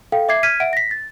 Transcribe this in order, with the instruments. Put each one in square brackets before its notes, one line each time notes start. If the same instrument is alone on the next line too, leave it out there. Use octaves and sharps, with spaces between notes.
[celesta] A4 F5 G5
E5 D6 G#6 C7
F6 G#6 B6 D#7
E5 F#5 D7
A#6 B6
A6